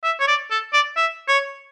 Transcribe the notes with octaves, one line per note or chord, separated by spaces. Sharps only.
E5
C#5
D5
A4
D5
E5
C#5